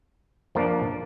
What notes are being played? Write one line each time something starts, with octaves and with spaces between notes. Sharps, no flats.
F3 A#3 D4